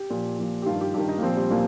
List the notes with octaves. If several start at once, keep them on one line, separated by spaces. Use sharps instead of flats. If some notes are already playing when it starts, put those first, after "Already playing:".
Already playing: G4
A#2 F3
A#2 F3
G4
G2 D#3 F4
G4
G2 D#3 G4
D#4
A#3
A#2 F3 C4
G3
A#2 F3 A#3